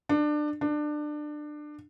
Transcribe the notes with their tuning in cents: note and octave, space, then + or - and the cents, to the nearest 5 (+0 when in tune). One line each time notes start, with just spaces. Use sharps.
D4 +25
D4 +25